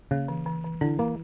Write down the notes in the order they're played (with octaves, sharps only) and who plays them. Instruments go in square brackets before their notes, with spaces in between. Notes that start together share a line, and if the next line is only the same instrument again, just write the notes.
[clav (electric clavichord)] C#3 [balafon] A#3
[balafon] E3
E3
E3
[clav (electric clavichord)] D3 [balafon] E4
[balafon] E3 [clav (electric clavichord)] A#3